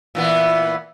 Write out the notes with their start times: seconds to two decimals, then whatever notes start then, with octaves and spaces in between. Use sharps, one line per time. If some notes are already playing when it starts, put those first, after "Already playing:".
0.15 A#2 E3 B3